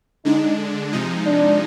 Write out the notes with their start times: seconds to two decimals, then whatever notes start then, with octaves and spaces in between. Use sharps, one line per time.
0.24 D3 G#3 D4 D#4
0.93 C3 F3 G#3 D#4
1.26 D4